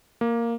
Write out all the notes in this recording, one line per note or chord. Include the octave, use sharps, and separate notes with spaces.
A#3